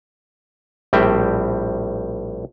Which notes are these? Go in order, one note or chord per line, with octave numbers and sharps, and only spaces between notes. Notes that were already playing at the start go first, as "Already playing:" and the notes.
A#1 A2 G3 C4 E5 G5